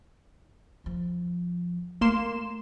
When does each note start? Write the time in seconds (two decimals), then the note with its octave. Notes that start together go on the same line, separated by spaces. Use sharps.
0.84 F2 F3
2.01 A3 A#3 C6 E7